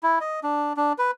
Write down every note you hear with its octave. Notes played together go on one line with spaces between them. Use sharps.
E4
D#5
D4
D4
B4